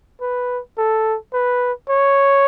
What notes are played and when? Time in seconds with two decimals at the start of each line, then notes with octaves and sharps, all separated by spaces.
0.21 B4
0.78 A4
1.33 B4
1.90 C#5